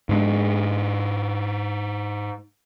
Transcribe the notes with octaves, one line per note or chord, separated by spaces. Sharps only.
G#2 G#3 D4